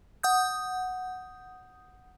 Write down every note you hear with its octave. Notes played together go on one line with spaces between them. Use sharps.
F#5 D#6 G6